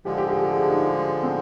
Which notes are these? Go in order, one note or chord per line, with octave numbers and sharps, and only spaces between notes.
D3 F3 G#3 G4
G4
G#4
G#4
G4
D#4
C4